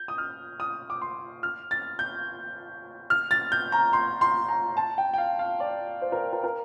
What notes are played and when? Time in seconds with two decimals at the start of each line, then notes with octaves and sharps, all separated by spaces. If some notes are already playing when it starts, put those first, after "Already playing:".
Already playing: G6
0.08 D#6
0.18 F6
0.60 D#6
0.90 D6
1.01 C6
1.43 F6
1.71 A6
1.99 G6
3.10 F6
3.31 A6
3.52 G6
3.72 A#5
3.93 C6
4.21 C6
4.49 A#5
4.77 A5
4.98 G5
5.14 G5
5.18 F5
5.39 F5
5.60 D5
6.02 C5
6.12 A#4
6.33 A#4
6.44 A#4